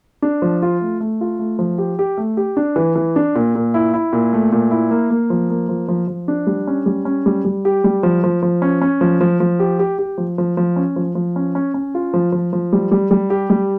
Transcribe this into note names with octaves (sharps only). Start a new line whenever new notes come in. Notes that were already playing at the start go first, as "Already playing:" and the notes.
D4
F3
F4
A3
A3
F4
A3
F3
G4
G4
A3
G4
D4
E3
E3
D4
A#2
A#2
E4
E4
A#2
A3
A#2
E4
A#3
A#3
F3
A#3
F3
F3
F3
D4
G3
C#4
G3
C#4
G3
G3
G4
G3
F3
F3
F3
C#4
C#4
F3
F3
F3
G4
G4
G4
F3
F3
F3
C#4
F3
F3
C#4
C#4
C#4
F4
F3
F3
F3
G3
G3
G3
G4
G3